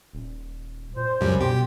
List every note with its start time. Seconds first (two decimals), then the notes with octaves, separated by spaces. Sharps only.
0.13 D#1
0.96 A#2 C5
1.21 C#2 F#2 C3 G3
1.41 B2 G4